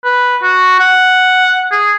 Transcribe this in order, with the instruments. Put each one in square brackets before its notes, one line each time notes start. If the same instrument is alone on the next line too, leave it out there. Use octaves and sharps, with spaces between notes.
[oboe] B4
F#4
F#5
G#4